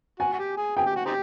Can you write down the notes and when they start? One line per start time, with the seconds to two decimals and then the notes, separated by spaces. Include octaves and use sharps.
0.19 F#4 G#5
0.33 F#4
0.39 G4
0.57 G#4
0.76 G#4 G5
0.86 G4
0.96 F#4
1.06 C4 D#4 G4